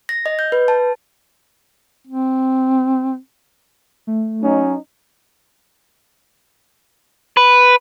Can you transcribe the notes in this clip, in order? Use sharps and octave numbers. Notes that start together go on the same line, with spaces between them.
A#6
D#5
G6
B4
A5
C4
A3
F#3 C#4 D#4
B4